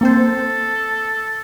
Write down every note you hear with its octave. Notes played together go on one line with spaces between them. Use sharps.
A#3 C4 A4 C5